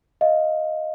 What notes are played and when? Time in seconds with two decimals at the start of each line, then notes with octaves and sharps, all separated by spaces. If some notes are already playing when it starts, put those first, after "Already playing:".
0.21 D#5 F5